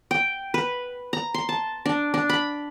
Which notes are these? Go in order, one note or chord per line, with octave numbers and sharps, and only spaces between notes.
G5
B4
A#5
C6
A5
D4
D4
B5